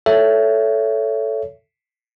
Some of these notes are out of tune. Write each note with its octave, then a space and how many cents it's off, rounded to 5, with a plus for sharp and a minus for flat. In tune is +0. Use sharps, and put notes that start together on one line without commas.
A4 +0 C#5 +20 E5 +15